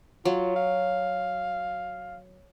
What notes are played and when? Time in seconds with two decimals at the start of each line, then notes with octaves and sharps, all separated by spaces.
0.25 F#3 F4
0.56 F5